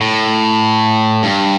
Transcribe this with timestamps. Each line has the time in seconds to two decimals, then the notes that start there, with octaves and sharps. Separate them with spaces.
0.01 A2
1.23 G2